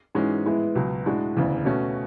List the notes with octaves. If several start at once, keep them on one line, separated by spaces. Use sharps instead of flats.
G#2 E3 G#3 C#4 F#4
A2 E3 G#3 B3 E4
C#2 B2 F#3
A2 G#3 D4 F#4
E1 D2 C#3 E3
B2 A3 C#4 F#4